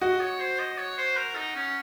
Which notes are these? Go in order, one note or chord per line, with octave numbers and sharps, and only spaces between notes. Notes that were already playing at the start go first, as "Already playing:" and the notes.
F#4 D#5
C#5
C5
D#5
C#5
C5
A#4
D#4
C#4